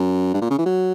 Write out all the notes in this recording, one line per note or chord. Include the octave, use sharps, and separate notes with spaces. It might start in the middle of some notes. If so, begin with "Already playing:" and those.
Already playing: F#2
G2
A#2
C#3
E3
F#3